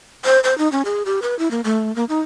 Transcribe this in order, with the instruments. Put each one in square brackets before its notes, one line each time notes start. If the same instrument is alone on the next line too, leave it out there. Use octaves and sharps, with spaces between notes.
[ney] C5
C5
D#4
C#4
G#4
G4
B4
E4
A#3
A3
A#3
D#4